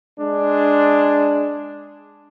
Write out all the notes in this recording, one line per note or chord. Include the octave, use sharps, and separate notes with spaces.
G#3 D4